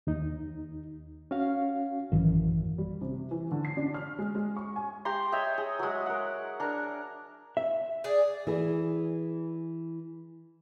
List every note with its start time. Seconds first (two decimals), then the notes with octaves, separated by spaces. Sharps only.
0.07 D#2 D#4
1.31 C#4 F#4 F5
2.12 A1 F#2 D#3 E3
2.78 G3
3.01 C3
3.31 E3
3.51 D3
3.65 C7
3.77 D4
3.94 F6
4.19 G#3
4.35 G#3
4.56 C#6
4.76 G#5
5.05 G4 A#5 C6
5.32 C#5 D#5 E5 G5
5.58 G#4
5.79 F#3 G#3
6.06 A#4 F#5
6.60 D4 A#4
7.57 E5
8.04 G#4 D5
8.47 E3 G#4